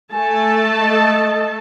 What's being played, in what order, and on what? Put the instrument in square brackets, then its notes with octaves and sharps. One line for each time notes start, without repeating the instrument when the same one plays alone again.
[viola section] A3 A4 A5 [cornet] G#5
[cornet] D#5